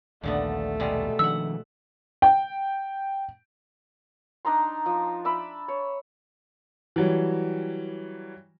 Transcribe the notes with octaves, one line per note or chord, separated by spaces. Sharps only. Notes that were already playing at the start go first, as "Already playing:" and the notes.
A#1 D#2 A#2 D3 A3 B3
B2 G3 G#3
D#3 F3 D4 E5 F#5 E6
G5
D4 D#4 A#5 C6
F3
D5 E5 B5
C#5
E3 F#3 G3